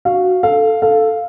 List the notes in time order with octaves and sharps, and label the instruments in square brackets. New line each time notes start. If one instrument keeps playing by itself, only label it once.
[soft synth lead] F#4 [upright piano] F5
[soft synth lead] A4 [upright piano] F5
[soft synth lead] A4 [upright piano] F5